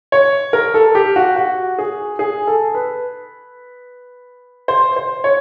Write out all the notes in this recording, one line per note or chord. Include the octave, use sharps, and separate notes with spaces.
C#5
A#4
A4
G4
F#4
F#4
G#4
G#4
A4
B4
C5
C5
C#5